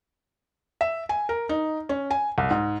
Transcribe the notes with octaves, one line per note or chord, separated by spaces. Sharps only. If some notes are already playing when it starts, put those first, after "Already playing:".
E5
G#5
A#4
D#4
C#4
G#5
C2
G#2